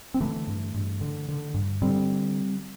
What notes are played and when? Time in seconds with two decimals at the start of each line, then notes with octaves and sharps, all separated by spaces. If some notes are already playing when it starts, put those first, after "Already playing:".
0.14 C4
0.20 D3 E3 A3
0.47 G2
0.74 G2
1.01 D3
1.28 D3
1.54 G2
1.82 D3 G3 C4